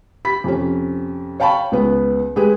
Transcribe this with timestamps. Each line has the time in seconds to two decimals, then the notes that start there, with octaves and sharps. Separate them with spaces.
0.25 G4 B5 B6
0.44 F2 C3 C#4
1.40 C#5 F5 G5 A5 B5 C#6
1.72 C#2 B3 B4
2.36 G#3 G4 G#4 B4